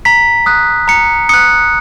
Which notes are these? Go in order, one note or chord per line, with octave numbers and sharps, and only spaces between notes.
A#5 B6
D#6 F#6
A#5 C#7
D#6 F#6 C#7